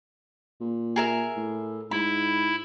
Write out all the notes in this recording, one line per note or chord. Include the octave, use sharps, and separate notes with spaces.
A#2
G#4 A#4 E5
A2
G#2 E4 B5